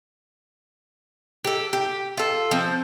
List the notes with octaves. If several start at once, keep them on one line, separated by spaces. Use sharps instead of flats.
G4 A4
G4
F4 A4
F3 C4